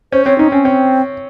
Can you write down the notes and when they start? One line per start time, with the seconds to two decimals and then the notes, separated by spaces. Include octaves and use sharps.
0.12 C#4 C5
0.25 C4 C#5
0.38 C#4 D#4
0.52 C4 C#4
0.65 C4 C#4